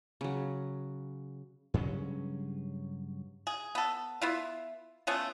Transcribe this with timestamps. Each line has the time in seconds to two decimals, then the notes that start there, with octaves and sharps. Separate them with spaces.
0.21 C#3 F#3
1.74 G2 C#3 F#3 C#4
3.47 G#4
3.75 B3 A4
4.22 B3 E4 F4
5.07 A3 B3 C#4 F4